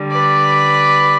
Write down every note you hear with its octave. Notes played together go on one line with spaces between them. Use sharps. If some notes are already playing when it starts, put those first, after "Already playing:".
Already playing: D3 G3
B4 D5